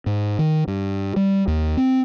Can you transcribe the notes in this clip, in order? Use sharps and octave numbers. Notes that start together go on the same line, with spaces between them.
G#2
D#3
G2
G3
D#2
C4